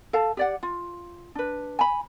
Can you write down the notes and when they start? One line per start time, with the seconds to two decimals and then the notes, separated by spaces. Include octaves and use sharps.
0.13 A4 F5 A5
0.37 G4 D5 F#5
0.63 F4
1.35 D4 B4
1.79 G#5 B5